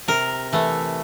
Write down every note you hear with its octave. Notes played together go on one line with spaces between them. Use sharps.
C3 A#4
E3 A3